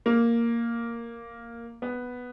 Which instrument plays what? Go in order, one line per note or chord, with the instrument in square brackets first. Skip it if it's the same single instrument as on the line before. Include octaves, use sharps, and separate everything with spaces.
[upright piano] A#3
B3